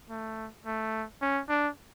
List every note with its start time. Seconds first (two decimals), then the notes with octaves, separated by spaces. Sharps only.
0.09 A3
0.66 A3
1.22 C#4
1.49 D4